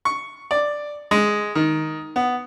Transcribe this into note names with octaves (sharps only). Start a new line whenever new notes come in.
C#6
D5
G#3
D#3
B3